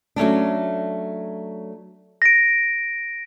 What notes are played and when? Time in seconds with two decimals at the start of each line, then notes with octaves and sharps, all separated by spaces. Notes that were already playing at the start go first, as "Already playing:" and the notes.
0.16 F#3 A3 C#4 D4
2.22 A#6 D7